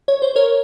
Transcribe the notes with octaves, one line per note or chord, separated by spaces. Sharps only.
C#5
C5
A#4 C#5